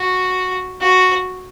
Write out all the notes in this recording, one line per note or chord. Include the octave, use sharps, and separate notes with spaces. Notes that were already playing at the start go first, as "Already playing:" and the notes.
Already playing: F#4
F#4